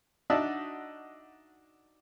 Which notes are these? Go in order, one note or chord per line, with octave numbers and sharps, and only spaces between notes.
D4 D#4 F#4 E5 A5